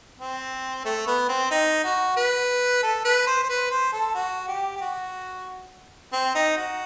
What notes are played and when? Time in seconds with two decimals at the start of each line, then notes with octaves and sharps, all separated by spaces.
0.19 C4
0.85 A3
1.07 B3
1.29 C4
1.51 D#4
1.84 F#4
2.17 B4
2.83 A4
3.05 B4
3.27 C5
3.43 C5
3.49 B4
3.71 C5
3.93 A4
4.14 F#4
4.48 G4
4.76 G4
4.81 F#4
6.12 C4
6.35 D#4
6.56 F#4